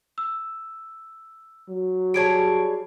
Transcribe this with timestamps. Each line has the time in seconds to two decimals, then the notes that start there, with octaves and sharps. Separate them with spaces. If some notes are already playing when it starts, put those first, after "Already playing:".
0.18 E6
1.69 F#3
2.14 G3 G#4 C#5 A5 G#6 D7